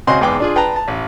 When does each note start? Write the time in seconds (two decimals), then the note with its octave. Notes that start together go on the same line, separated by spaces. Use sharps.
0.07 C#2 C4 F#4 D#5 G#5 C6
0.21 E2 G#2 G#4 B4 G5 D6
0.40 D4 F4 G#4
0.55 B4 G5 A5 A#5
0.76 A5
0.88 A1